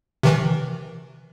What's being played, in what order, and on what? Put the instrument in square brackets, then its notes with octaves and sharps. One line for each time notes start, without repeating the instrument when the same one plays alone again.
[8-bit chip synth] C3 D#3 E3